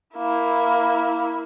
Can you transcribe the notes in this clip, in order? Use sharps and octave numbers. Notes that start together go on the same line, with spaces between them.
A#3 E4